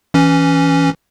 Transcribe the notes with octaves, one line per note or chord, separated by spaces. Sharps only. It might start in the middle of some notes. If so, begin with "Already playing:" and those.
E3 C#4